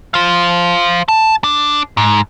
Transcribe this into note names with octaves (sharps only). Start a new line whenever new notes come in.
C5 F5
A5
D4
G#2